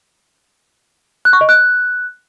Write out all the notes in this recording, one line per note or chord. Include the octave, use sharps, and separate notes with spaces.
F#6
C#6
D#5
F#6